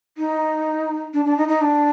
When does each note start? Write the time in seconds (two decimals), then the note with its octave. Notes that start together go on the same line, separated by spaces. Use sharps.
0.18 D#4
1.14 D4
1.25 D4
1.38 D#4
1.48 D#4
1.61 D4